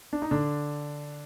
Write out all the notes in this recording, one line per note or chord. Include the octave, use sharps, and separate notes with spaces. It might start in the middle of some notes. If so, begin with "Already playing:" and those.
D4
D#4
D3 D4